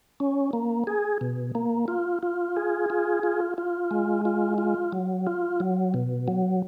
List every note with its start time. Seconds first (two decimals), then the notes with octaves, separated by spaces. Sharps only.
0.20 C#4
0.53 A#3
0.87 G#4
1.21 B2
1.55 A#3
1.88 F4
2.23 F4
2.57 G#4
2.90 F4
3.23 F4
3.58 F4
3.91 G#3
4.25 F4
4.58 F4
4.92 F#3
5.27 F4
5.60 F#3
5.94 B2
6.28 F#3